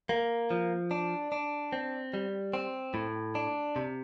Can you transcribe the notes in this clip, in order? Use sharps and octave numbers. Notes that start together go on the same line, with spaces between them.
A#3
F3
D4
D4
C4
G3
C4
A2
D4
C3